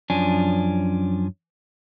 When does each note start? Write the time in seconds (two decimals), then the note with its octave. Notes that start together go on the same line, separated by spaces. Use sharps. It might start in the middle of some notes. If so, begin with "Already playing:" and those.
0.10 F#2 F3 C#4 D4 G#5